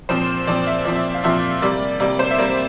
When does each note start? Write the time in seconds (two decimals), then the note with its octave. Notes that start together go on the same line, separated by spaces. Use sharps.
0.09 A#2 F3 C4 C5
0.47 A#2 F3 C4 D5
0.67 E5
0.85 A#2 F3 C4 D5
0.95 E5
1.14 F5
1.24 A#2 F3 C4 E5
1.62 C3 G3 A#3 D5
2.00 C3 G3 A#3 D5
2.19 C5
2.31 E5
2.38 C3 G3 A#3 D5